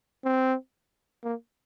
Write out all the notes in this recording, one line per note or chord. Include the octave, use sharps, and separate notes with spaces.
C4
A#3